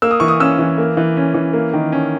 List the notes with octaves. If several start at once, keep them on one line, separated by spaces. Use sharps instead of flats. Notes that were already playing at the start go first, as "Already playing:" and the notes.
A#3 E6
D#6
E3 C#6
D#6
C#4 E6
E3
A#3
E3
C#4
E3
A#3
D#3
C#4